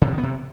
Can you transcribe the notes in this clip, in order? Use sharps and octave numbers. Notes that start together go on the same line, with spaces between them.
C#3
C3
D#3
B3
C3